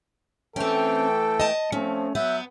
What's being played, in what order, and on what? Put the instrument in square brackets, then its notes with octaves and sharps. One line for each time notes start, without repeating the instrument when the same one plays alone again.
[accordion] E3 A3 G5 [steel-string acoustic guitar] C4 C#4 [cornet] A4
[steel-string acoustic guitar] D#5 A5
[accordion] F3 C4 [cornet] A3 [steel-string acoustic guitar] C#4
[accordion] F#3 F#6 G6 [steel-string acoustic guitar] B3 [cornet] E5